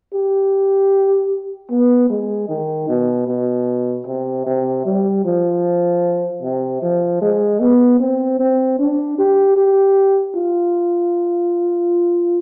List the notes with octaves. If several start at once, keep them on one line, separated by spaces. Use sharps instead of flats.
G4
B3
G#3
D#3
B2
B2
C3
C3
G3
F3
C3
F3
G#3
B3
C4
C4
D4
G4
G4
F4